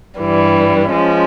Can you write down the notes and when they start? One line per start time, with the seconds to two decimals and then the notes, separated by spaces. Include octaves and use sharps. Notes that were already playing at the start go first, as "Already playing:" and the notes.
0.17 G2 E3 G3
0.90 F3 G#3 C#4